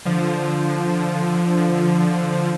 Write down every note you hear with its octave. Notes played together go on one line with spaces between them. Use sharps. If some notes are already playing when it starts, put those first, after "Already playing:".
D3 F3